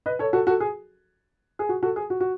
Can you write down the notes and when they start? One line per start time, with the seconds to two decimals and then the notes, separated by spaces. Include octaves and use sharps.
0.06 B4 D#5
0.19 A4 C#5
0.33 F#4 A4
0.47 F#4 A4
0.60 G#4
1.59 G#4
1.69 F#4
1.83 F#4 A4
1.96 G#4
2.10 F#4
2.20 F#4